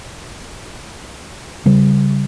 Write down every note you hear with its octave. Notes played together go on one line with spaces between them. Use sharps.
C#3 G3